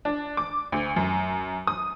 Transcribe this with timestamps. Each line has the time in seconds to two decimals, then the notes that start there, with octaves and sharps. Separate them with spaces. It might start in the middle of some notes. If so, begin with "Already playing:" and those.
0.05 D4
0.37 D6
0.72 D2
0.96 F#2
1.67 D#6